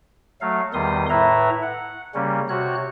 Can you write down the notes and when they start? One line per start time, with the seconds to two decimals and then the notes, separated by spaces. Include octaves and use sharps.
0.41 F#3 A3 F5
0.74 E2 D#3 G3 C6 D#6
1.10 A2 E4 B4 E5 A#5
1.62 F#5
2.15 C#3 G3 A#3 C#4
2.49 C3 F#4 C#5 F#6